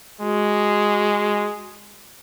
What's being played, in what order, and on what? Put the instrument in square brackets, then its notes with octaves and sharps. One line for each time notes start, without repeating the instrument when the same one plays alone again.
[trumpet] G#3 [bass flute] F#4